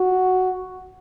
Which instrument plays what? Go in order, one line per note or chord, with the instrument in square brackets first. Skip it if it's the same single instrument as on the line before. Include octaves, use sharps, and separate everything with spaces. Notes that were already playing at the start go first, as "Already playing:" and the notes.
Already playing: [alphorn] F#4